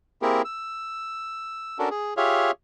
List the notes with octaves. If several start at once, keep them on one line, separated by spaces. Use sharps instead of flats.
A#3 C4 E4 G4 G#4 A#4
E6
C#4 D4 F#4 A4 A#4
G#4
F4 G4 G#4 C#5 E5 F5